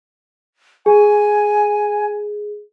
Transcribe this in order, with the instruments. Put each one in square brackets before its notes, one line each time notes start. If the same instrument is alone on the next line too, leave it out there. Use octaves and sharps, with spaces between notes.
[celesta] G#4 [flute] G#5